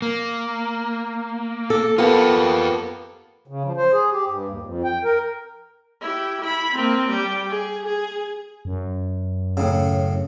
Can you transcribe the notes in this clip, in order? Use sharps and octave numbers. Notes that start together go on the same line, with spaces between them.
A#3
A4
A#3 B3 F4 G4 A4
C#3
F3
C5
G#4
G4
G2
D#2
F2
G5
A#4
E4 G4
E4 B5
A#3 C4
G3 G4
G#4
G#4
F#2
A2 C#3